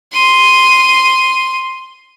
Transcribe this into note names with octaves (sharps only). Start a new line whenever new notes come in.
C6 D#7